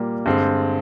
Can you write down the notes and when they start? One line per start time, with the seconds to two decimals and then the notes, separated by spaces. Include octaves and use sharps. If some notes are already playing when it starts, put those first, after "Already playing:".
Already playing: A#2 G3 A#3
0.26 G2 D3 G#3 C4